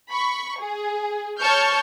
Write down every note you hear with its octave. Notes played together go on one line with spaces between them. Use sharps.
B5 C#6
G#4
C#5 A5 C#6 F6 G6